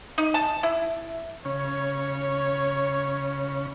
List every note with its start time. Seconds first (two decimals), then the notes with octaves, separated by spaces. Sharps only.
0.18 D#4
0.34 A5
0.63 E4
1.45 C#3 C#4 C#5